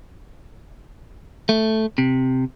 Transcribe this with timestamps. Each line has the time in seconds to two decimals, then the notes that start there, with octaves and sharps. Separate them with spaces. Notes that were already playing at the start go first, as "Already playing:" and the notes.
1.49 A3
1.98 C3